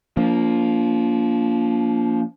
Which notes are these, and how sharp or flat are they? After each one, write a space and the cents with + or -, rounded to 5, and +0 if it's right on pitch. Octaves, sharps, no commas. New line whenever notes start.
F3 +0 A#3 +0 D4 -40